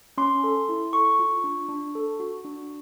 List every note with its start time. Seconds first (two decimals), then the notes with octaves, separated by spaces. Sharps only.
0.18 C#4 C6
0.44 A4
0.69 E4
0.93 A4 C#6
1.19 F4
1.44 D4
1.69 D4
1.95 A4
2.20 F#4
2.45 D4